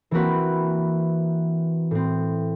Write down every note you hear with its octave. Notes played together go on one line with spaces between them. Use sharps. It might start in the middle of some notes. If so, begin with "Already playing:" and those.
E3 A#3 C4 F#4 A#4 B4
A2 C4